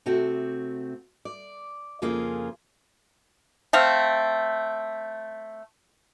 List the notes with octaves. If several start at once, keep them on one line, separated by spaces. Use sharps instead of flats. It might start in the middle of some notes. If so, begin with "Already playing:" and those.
C3 A3 C4 F#4
D5
F2 C#3 A#3 C#4 F4 G#4
A3 C4 F5